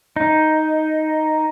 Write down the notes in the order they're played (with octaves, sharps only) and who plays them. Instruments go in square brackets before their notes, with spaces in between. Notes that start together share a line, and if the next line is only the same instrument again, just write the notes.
[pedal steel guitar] D#4